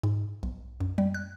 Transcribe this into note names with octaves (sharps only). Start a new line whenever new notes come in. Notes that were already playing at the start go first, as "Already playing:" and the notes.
G#2
B1
F#2
G3
F#6